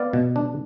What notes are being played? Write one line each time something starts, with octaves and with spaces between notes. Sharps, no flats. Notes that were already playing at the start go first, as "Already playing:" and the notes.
Already playing: B3 D5 F5
B2
D4